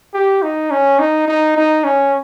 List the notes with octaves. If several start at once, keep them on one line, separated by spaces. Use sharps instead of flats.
G4
D#4
C#4
D#4
D#4
D#4
C#4